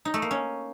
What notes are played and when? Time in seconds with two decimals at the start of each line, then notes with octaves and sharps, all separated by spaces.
0.05 D#4
0.14 A3
0.22 A#3
0.31 C#4